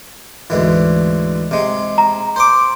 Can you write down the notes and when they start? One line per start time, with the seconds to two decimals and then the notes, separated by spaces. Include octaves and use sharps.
0.50 D2 G#2 E3
1.51 C3 G#3
1.98 A#5
2.36 C5 C6 D6